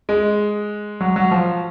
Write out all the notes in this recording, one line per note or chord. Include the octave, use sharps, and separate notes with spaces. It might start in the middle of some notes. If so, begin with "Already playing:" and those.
G#3
F#3
F#3
F3